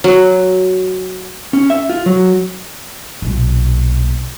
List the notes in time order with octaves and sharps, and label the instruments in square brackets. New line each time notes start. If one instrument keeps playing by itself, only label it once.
[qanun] F#3
[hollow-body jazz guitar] C#4
E5
F4
F#3
[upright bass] B1 A#2